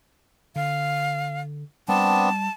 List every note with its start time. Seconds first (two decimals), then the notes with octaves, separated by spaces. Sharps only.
0.56 D3 F5
1.88 G3 B3 C4 D4 A5